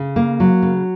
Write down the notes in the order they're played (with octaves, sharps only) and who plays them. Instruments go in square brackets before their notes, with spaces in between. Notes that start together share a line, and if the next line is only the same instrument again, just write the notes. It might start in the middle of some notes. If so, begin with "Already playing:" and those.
Already playing: [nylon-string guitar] C#3
A#3
F#3
C#3